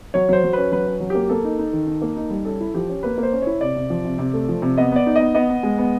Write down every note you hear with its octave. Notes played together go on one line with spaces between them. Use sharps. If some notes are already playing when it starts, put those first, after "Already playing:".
F#3 C#5
F#3 C5
F#3
C#4 B4
F#3 B4
C#4
F#3
A#3 G4
A#3 A4
D#4
D#4
D#3
D#4
A#3
D#4
G3
C#4 A4
E4
F3 G4
C#4
A#3 B4
A#3
C5
C#4
E4 C#5
C3 D5
C3
F3
C3
C3
A3
F3
C3
B3 D#5
B3 D5
D#4
B3 D#5
B3 D#5
B3
G#3
B3